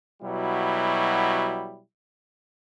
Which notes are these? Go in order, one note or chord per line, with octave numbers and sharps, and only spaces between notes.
B2 F#3 G3 E4